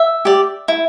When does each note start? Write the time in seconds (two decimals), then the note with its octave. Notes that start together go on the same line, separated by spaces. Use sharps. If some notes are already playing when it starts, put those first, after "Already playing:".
Already playing: E5
0.25 G4 D5
0.68 E4